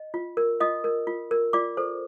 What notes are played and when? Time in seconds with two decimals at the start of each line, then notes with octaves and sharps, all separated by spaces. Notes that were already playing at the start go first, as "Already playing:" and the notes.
Already playing: D#5
0.14 F4
0.37 A#4
0.60 F4 D#5 D#6
0.84 A#4
1.07 F4
1.31 A#4
1.53 F4 D5 D6
1.77 A4 C5